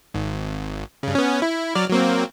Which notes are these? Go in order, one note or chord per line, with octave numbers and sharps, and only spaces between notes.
G#1
G2 C#3
B3 C#4
E4
F#3 D5 F6
F#3 A#3 C4